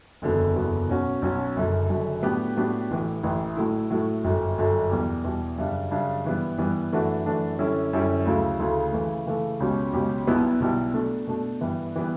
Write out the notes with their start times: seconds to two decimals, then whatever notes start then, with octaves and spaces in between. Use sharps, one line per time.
0.22 F#1 E2 D3 F#3 B3
0.55 F#1 E2 D3 F#3 B3
0.89 B1 B2 F#3 C#4 F#4
1.22 B1 B2 F#3 C#4 F#4
1.56 F#1 F#2 D3 F#3
1.89 F#1 F#2 D3 F#3
2.22 A2 F#3 B3 D4 G4
2.56 A2 F#3 B3 D4 G4
2.90 A1 A2 E3
3.23 A1 A2 E3
3.57 A2 F#3 A3 E4
3.91 A2 F#3 A3 E4
4.24 G1 F#2 D3 F#3
4.58 G1 F#2 D3 F#3
4.91 E2 B2 G3
5.24 E2 B2 G3
5.58 F#2 C#3 G3 D4
5.91 F#2 C#3 G3 D4
6.25 G2 E3 G3 B3
6.58 G2 E3 G3 B3
6.92 F#2 E3 A3 D4 F#4
7.25 F#2 E3 A3 D4 F#4
7.59 F#2 D3 G3 C#4 E4
7.93 F#2 D3 G3 C#4 E4
8.25 D2 C#3 F#3 A3 E4
8.59 D2 C#3 F#3 A3 E4
8.93 C#3 E3 A3
9.26 C#3 E3 A3
9.60 C#2 B2 F#3 C#4 G4
9.93 C#2 B2 F#3 C#4 G4
10.27 B1 B2 G3 B3 E4
10.60 B1 B2 G3 B3 E4
10.94 B2 A3 D4
11.27 B2 A3 D4
11.61 G2 E3 G3 B3
11.96 E3 G3 B3